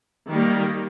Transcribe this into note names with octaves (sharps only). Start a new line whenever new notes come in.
D#3 G3 A#3